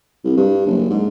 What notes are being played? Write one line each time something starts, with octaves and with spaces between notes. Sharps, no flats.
C2
G2
F#1
G#2